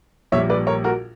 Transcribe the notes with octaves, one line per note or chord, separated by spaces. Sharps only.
A#1 A#2 G3 C#5 E5
B4 D5
A#4 C#5
F#4 A#4